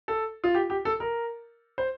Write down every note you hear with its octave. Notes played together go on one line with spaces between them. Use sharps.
A4
F4
G4
G4
A4
A#4
C5